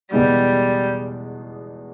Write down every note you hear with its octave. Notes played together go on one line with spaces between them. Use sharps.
E2 B2 G3 G#3 B3 D4